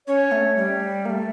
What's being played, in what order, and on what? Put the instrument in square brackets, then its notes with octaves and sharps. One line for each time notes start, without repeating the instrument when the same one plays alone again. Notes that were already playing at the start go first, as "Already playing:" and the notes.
[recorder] C#4 [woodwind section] C#5
[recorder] A3
G3
A#3
A3